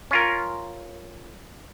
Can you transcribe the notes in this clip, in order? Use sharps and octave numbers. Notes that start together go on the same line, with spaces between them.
C#4 F4 A#4